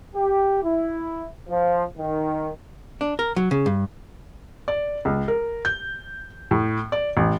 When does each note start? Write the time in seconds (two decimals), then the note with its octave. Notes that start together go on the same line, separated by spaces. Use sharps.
0.15 G4
0.64 E4
1.49 F3
1.98 D#3
3.01 D4
3.19 A#4
3.36 F#3
3.51 C#3
3.66 G2
4.68 D5
5.05 C#2
5.28 A#4
5.65 G6
6.51 A2
6.92 D5
7.17 A1